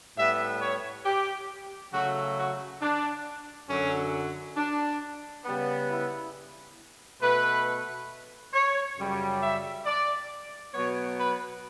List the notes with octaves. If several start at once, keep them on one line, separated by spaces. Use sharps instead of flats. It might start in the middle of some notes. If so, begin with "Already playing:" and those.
A2 G3 B3 E5
C#5
G4
C#3 F#3 A3 F#4
F#4
D4
F#2 D3 F#3 C#4
D4
C#3 G3 B3
E4
B2 A3 B4
C#5
F#2 C#3 G3
E5
D5
B2 F#3 B3 C#5
B4